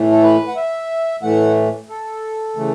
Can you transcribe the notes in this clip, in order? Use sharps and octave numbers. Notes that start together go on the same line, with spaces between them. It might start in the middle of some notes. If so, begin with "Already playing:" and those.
Already playing: A2 E3 A3
A4
B4
F#5
E5
A2 E3 A3 F#5
A4
C#3 E3 A3